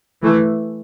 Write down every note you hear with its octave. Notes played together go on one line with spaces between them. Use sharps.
E3 A3